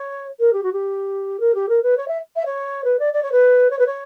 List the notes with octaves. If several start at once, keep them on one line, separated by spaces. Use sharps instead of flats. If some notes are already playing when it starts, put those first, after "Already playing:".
Already playing: C#5
A#4
G4
F#4
G4
A#4
G4
A#4
B4
C#5
E5
E5
C#5
B4
D5
D5
C#5
B4
C#5
B4
C#5